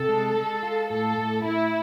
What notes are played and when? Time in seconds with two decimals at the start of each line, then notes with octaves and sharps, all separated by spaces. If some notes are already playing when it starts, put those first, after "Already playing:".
Already playing: C3 A4
0.09 G#3
0.35 G#3
0.63 F4
0.90 A2 A4
1.17 A2
1.43 A2 E4